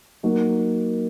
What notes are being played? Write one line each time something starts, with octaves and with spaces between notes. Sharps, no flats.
F#3 A#3 D#4 F#4